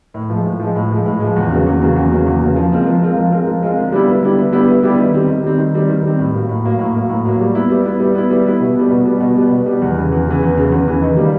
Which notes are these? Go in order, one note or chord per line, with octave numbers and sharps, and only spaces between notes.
A2
F3
G#3
A2
F3 G#3
A2
F3 G#3
A2
F3 G#3
E2
C#3 F#3 A#3
E2
C#3 F#3 A#3
E2
C#3 F#3 A#3
E2
C#3 F#3 A#3
F3
G#3 C4 F4 A#4
F3
G#3 C4 F4 A#4
F3
G#3 C4 F4 A#4
F3
G#3 C4 F4 A#4
D3
G3 B3 E4 G4
D3
G3 B3 E4 G4
D3
G3 B3 E4 G4
D3
G3 B3 E4 G4
D#3
G3 C4
D#3
G3 C4
D#3
G3 C4
D#3
G3 C4
A2
F#3 A#3
A2
F#3 A#3
A2
F#3 A#3
A2
F#3 A#3
G3
B3 E4
G3
B3 E4
G3
B3 E4
G3
B3 E4
B2
G3 B3
B2
G3 B3
B2
G3 B3
B2
G3 B3
E2
C#3 E3
E2
C#3 E3
E2
C#3 E3
E2
C#3 E3
D#3
G3 A#3